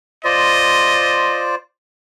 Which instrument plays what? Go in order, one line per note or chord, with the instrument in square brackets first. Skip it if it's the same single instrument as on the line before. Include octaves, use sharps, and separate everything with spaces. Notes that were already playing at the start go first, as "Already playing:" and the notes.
[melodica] F4 C5 D5 [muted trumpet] D#5